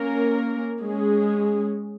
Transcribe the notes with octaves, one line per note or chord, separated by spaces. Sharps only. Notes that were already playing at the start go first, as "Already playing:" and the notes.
Already playing: A#3 C#4 A#4
G#3 C#4 G#4